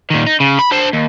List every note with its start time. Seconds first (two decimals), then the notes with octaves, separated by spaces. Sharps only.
0.10 A#2 D#3
0.27 D#4
0.40 C#3
0.59 B5
0.72 D4 C5
0.94 D#2